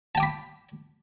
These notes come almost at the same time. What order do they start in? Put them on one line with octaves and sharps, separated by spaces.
A5 G5 D6 B5